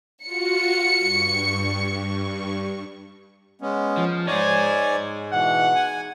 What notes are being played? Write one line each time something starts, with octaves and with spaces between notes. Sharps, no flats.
F4 F#4 C#7
G2 C#6
G#3 B3 C#4
F3
G#2 D#4 G#4 C#5 D5 G#5
B2 E3 F#5
G#5